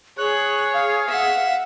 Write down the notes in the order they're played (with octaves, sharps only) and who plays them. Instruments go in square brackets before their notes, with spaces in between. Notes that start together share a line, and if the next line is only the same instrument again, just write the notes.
[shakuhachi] G#4 [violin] C#5 [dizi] F#6
[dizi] F5
[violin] E5 F#5